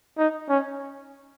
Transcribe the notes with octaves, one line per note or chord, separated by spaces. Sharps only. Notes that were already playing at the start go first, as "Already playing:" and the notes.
D#4
C#4